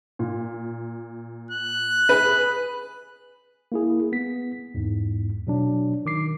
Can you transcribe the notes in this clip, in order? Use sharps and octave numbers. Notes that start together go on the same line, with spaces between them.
A#2
F#6
G#4 B4
A#3 E4 G#4
B3 B6
E2 G#2
B2 F#3 D4
D#3 D6 C7